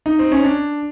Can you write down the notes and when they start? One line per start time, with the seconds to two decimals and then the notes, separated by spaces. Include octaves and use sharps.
0.06 D#4
0.19 C4
0.32 C#4
0.44 D4